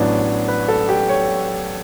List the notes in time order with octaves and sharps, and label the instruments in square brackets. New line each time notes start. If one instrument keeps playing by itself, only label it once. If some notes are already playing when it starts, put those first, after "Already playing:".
Already playing: [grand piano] A1 A2 F#3 B3 D4 C#5
B4
A4
G4
C#5